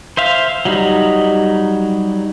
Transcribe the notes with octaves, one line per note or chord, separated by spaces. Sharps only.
C5 E5 F5
F#3 G3 D#4